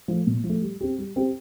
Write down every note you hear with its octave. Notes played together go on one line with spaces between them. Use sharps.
F3 A3
A#2
F3
A3
G3
C4 G4
G3
C4 G4